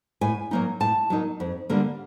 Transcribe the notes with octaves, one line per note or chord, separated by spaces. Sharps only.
A2 G#5
F#3 A#3 D#4
A2 A5
F#3 A#3 D#4
F2
D3 G3 A#3